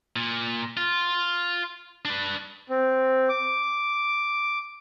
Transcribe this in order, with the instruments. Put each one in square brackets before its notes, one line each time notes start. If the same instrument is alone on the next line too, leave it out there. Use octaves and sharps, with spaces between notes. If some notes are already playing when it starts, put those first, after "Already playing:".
[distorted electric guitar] A#2
F4
D4 B4
[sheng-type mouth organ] C4
D6